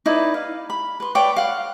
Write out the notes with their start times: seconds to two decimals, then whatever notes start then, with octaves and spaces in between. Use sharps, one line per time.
0.06 D#4 E4 B4 D5
0.34 F5
0.70 B5
1.00 B4 C6
1.15 B4 C#5 D5 G5
1.36 F5 F#5